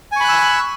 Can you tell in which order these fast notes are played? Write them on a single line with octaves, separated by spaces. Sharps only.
G#5 C#6 B5 F#6 E6